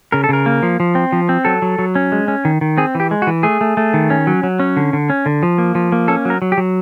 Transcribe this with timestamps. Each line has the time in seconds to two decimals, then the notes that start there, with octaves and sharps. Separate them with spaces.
0.12 C#3 A#4
0.24 A4
0.29 C#3 A#4
0.46 A#3
0.63 F3
0.80 F3
0.95 C4
1.12 F3
1.29 C4
1.45 F#3 A4
1.62 F#3
1.79 F#3
1.95 C#4
2.12 G#3
2.28 C#4
2.45 D#3
2.61 D#3
2.78 C4 G#4
2.95 E3
3.00 G4
3.11 G#3
3.22 F#4
3.27 E3
3.43 A3 G#4
3.61 A3
3.77 A3
3.94 D#3
4.10 C#4
4.27 F#3
4.43 F#3
4.59 C#4
4.77 D3
4.93 D3
5.10 C#4
5.26 D3
5.43 F3
5.58 A#3
5.75 F3
5.92 A#3
6.08 C#4 A4
6.25 F#3 A#4
6.42 F#3
6.52 G4
6.57 F#3